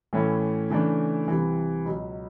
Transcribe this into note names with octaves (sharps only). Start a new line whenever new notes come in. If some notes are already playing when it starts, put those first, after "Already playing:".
A2 E3 A3 C#4 E4
C#3 E3 A3 D4
C2 C3 E3
C#2 B2 F#3